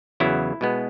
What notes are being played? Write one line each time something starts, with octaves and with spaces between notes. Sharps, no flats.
E2 C#3 F#3 B3 E4
B2 G#3 B3